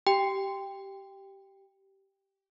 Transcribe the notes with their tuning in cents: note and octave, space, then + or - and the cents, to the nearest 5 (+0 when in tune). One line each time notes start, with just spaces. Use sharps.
G4 -15 G5 +15